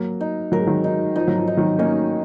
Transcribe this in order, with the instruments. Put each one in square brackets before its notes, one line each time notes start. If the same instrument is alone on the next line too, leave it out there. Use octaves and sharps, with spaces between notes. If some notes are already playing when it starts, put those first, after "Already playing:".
Already playing: [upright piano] F#3 A#3
[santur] D#4
[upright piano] F#3 [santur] A#4
[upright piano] G#3
D#3 F#3
[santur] D#4
[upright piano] F3 [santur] D#4
[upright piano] F#3
F3
[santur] D#4
[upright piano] D#3 F#3
[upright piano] A#3 C#4 [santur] D#4